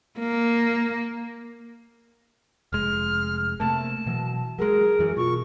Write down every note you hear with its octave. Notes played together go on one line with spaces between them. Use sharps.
A#3
F1 G#3 F6
C3 A3 A#3 A5
B2 E3 F#3
F#3 G#3 G#4 A#4
F#2 E3 F#3
B2 F4 C#6